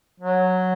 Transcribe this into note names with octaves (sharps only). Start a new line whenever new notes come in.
F#3